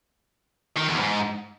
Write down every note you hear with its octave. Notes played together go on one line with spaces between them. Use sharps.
D#3
E2
G#2